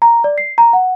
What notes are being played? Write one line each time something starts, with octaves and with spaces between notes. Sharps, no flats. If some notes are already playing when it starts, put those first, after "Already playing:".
A#5
D5
C7
A#5
F#5